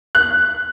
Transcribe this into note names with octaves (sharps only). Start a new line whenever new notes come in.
F#6